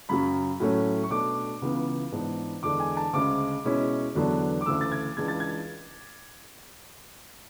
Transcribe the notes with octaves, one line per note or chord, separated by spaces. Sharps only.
F#2 C#3 F#3 B5
A2 F#3 A3 C#4
C#6
B2 A3 D4 D6
C#2 C#3 E3 B3
G#2 E3 B3 D4
E2 D3 G#3 D4 D6
G#5
A5
D2 C#3 G#3 D6
B2 G#3 C#4 E4
E2 D3 F#3 B3 D4
D6
D2 C#3 E3 A3 E6
A6
G#6
C#2 C#3 E3 G#3 D4 G#6
A6
G#6